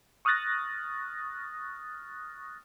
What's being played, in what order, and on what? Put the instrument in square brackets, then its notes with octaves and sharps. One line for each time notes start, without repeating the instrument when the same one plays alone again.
[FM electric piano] C#6 D#6 F6 F#6 A6 A#6